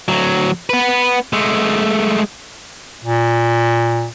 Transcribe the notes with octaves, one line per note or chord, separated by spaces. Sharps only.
D2 F#3
B3 B4
G#3 A3
A#2